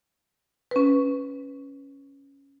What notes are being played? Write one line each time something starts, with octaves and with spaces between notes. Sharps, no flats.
C#4 B4